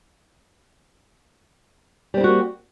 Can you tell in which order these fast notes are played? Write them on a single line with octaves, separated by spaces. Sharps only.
G3 C4 E4 F#4 A#3